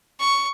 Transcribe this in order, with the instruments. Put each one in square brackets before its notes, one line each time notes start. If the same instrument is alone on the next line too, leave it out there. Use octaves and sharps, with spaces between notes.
[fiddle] C#6